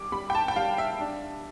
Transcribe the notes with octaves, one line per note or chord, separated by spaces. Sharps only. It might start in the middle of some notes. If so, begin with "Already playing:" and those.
Already playing: G3 D6
G3 B5
G5
A5
G5
G3 F5
E5
D4